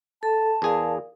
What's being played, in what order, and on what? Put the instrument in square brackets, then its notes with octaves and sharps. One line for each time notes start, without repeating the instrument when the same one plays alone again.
[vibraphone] A4 [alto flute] A5
[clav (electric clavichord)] E2 G#4 [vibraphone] A#4 D5 F5